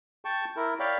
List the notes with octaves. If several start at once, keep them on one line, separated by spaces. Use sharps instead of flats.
G5 A5 C#6
E4 A#4
C#5 D5 F5 G5 B5